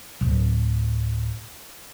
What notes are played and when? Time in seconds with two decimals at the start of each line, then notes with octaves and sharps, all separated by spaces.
0.21 D1 G1